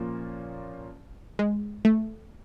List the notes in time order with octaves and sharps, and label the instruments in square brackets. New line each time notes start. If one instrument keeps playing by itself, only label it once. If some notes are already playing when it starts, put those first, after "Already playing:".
Already playing: [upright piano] A#2 F3 A#3 C#4
[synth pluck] G#3
A3